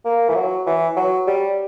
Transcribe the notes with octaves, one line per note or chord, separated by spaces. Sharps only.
A#3
E3
F#3
E3
F#3
G3